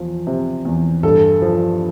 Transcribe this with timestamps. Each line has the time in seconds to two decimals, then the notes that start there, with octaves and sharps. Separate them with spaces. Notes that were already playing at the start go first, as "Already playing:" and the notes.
Already playing: E2 F3
0.27 C3
0.65 E2
1.03 G2 A4
1.42 F3